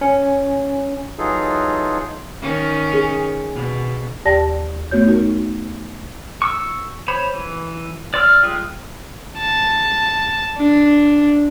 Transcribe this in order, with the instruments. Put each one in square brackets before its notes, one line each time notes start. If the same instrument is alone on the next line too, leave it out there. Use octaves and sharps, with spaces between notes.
[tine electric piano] C#4
[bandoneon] E3 F#3 D#4 F4 G#4 A4
[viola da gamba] D#3 C#4
[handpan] G#4
[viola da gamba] B2
[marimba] D#2 G4 D5 G5 A5 A#6
A3 B3 F#4 C#5 G6
D#4 F#4 A#4
[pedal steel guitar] C#6 E6
C5 C#5 B5
E3
D5 C6 E6 F6
G3 G#3 F4
[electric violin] A5
D4